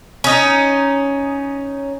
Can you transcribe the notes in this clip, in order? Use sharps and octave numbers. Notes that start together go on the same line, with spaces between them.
C#4 D#4